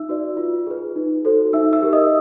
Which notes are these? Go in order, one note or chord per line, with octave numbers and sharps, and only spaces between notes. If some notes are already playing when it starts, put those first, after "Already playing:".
Already playing: D#4 E5 E6
F#4 B4 D5
F4
G#4 B4
D#4
F#4 A4 C5
D#4 E5 E6
E5 E6
G4 A#4
D#5 D#6